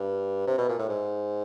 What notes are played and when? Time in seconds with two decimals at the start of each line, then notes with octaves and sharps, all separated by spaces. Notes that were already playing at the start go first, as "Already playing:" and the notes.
Already playing: G2
0.48 C3
0.58 B2
0.69 A#2
0.79 A2
0.89 G#2